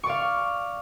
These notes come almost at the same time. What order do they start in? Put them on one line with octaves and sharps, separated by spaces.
C#6 D5 F5